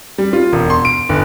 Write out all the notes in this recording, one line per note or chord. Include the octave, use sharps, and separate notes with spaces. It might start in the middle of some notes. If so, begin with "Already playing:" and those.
G3
F4
E1
C6
D7
G1